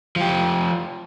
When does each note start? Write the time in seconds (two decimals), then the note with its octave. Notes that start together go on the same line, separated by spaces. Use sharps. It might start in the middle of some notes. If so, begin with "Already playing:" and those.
0.16 F3 G4